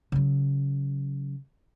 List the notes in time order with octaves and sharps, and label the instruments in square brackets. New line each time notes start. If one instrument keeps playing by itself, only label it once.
[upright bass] C#3 F#3